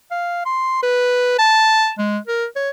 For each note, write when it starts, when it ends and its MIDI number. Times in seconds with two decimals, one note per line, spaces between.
0.11 0.44 77
0.45 0.81 84
0.83 1.37 71
1.38 1.91 81
1.98 2.18 56
2.27 2.45 70
2.56 2.70 73